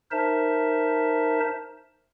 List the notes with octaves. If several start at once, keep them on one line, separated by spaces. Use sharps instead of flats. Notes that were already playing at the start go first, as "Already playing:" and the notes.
D#4 A#4 C5 E5 A5